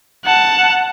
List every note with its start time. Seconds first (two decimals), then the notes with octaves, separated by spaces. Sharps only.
0.25 F#5 A5